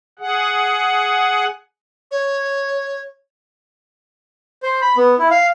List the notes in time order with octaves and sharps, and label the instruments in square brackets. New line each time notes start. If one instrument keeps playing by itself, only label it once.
[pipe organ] G#4 F#5
[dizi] C#5
[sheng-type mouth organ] C5
B5
B3
E4
F5